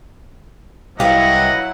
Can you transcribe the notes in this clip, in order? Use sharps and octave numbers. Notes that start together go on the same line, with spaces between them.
C2 F#3 E4 G4 B4 D#5 F5 F#5